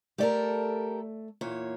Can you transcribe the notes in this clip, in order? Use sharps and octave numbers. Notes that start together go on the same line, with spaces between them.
A3 G4 A4 A#4 D5
E2 A#2 C#5